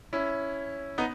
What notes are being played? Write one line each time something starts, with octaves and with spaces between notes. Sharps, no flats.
C#4 E4
B3 D#4